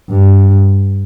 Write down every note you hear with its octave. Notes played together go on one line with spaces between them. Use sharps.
G2